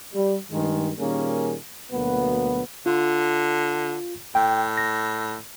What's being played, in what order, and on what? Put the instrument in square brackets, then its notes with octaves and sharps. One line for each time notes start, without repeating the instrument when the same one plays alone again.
[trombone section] G3
G2 D#3 G#3
A#2 D#3 G3 A#3 C#4 G#4
D2 B2 F#3 A#3 B3
[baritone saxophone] D3 [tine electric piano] F4
[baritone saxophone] A2 [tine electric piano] G5
[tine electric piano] A#6